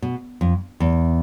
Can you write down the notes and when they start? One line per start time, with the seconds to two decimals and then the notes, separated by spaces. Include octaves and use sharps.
0.02 B2
0.41 F2
0.80 E2